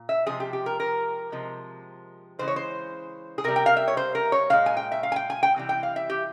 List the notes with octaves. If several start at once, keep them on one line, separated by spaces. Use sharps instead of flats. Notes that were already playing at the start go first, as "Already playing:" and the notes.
Already playing: A#2
E5
C3 F3 G#3 G#4
G4
G4
A#4
A#4
C3 F3 G#3
C#3 E3 G#3 C5
C#5
C5
G#4
C3 G3 A#4
G5
F5
E5
C#5
C5
A#4
C#5
A#2 G#3 F5
G#5
G5
E5
F5
G#5
G5
G#5
G5
C3 E3 G3
G5
F5
E5
G4